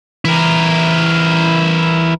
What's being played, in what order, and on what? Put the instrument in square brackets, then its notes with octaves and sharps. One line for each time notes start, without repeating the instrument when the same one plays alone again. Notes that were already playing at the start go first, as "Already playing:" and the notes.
[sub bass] E3 [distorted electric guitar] E4 A#4